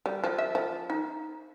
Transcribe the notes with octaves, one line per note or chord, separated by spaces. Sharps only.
G3
F3
E5
F3
D#4